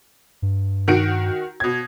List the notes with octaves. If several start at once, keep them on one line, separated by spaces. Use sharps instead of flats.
G2
D#3 F#4 D7
B2 G#6